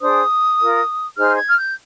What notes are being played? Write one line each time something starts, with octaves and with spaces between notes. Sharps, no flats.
D4 G#4 C5 D#6
F4 A#4
D#4 G#4 C5 F6
G#6
F6
G6